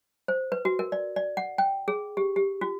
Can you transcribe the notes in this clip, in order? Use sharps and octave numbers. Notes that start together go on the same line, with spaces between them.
C5
B4
F#4
A#4
D5
D5
F#5
G5
G#4
G4
G4
F4